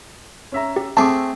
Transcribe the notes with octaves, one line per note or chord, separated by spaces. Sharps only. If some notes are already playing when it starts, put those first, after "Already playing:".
C#4 E5 A#5
G4
A3 C4 G#4 A5 D6